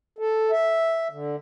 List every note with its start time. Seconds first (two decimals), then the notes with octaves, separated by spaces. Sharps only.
0.18 A4
0.51 E5
1.10 D3